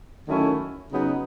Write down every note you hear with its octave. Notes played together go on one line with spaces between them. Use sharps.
D#3 F#3 A3 C#4 E4
C#3 F#3 B3 D#4